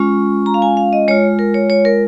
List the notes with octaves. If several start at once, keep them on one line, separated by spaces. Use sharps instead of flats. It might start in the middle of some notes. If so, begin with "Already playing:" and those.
Already playing: G#3 C#4 F4 C#6
A#5
F5
G#5
F5
D#5
G#3 F4 C#5
A#4
C#5
C#5
A#4